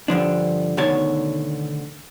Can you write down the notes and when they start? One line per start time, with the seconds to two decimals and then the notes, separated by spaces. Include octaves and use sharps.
0.08 G2 D3 F3 D4
0.77 D2 B2 D3 D#3 C#5 A5